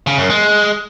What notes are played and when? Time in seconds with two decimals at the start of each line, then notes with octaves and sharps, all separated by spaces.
0.07 C#3
0.18 F#2
0.30 G#3